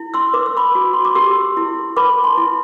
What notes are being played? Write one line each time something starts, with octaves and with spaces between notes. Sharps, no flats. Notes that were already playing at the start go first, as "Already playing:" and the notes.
Already playing: E4
C6 E6
B4 D6
E6
B5 D6
F#4
C6
D6
G4 C6 E6
E4
B4 B5 D6
A5 C6
E4